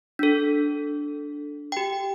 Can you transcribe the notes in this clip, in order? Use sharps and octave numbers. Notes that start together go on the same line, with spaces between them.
D4 A4
G4 G5